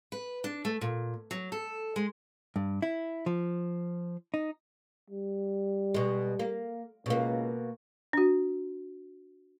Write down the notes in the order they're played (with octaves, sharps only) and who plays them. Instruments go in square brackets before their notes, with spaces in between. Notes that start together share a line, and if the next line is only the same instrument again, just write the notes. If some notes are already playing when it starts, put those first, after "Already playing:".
[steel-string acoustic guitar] B4
D4
A3
A#2
F#3
A4
G#3
[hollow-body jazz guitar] G2
E4
F3
D#4
[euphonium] G3
[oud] B2 G#3
A#3
[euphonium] C#2 [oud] B2 A#3
[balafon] D4 F#4